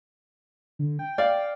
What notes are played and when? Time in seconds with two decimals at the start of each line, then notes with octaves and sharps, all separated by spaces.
0.79 D3
0.99 G5
1.18 D5 F5